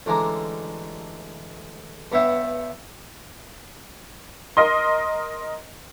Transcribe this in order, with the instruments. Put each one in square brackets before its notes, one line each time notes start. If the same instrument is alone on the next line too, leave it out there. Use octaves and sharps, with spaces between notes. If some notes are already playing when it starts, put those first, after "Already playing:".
[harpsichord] A1 D3 G#3 G#5 A#5 D6
G2 B3 C#5 E5 G5
[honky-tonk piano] A#4 D#5 C6